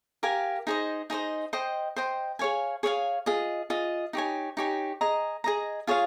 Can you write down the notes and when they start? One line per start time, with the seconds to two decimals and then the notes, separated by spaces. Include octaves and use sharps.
0.23 G4 A#4 F5 G#5
0.67 D#4 G#4 C5 D#5
1.10 D#4 G#4 C5 D#5
1.53 C5 D#5 G5 C6
1.96 C5 D#5 G5 C6
2.39 G#4 C#5 F5 G#5
2.83 G#4 C#5 F5 G#5
3.26 F4 G#4 D#5
3.70 F4 G#4 D#5
4.13 D#4 G4 C#5 G#5
4.57 D#4 G4 C#5 G#5
5.01 G#4 D#5 A#5
5.44 G#4 D#5 A#5
5.87 F4 G#4 C#5 F5